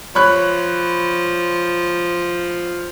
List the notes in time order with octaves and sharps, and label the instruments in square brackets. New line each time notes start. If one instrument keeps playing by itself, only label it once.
[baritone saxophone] F3 [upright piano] C#5 B5 F#6